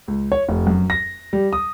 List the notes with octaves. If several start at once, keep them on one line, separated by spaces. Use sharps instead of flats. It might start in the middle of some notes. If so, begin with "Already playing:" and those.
C#2
C#5
F1
F#2
A#6
G3
D#6